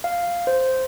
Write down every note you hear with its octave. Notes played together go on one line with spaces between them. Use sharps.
F5
C5